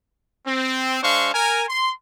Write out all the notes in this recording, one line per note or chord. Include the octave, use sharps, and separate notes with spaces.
C4
G#3 D4 C5 F5 C#6
A#4 G#5
C6